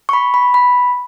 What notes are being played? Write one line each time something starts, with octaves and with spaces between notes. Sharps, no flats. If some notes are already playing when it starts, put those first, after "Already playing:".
C#6
B5
B5
B5